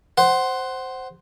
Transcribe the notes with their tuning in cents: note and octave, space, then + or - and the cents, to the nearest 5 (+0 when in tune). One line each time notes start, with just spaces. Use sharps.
C5 +0 F#5 +15